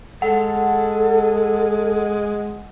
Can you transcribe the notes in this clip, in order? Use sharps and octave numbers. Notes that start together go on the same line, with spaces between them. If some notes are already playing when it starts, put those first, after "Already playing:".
G#3 A4 F#5